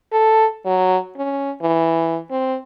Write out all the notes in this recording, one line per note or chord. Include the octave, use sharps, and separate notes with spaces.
A4
F#3
C#4
E3
C4